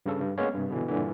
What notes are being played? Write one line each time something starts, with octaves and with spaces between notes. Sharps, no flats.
G2 C#3 A4
G2
G#3 A#3 B3 C#4 C#5
G2 C3
B2 D3 E3
G2 A#2 D3 E3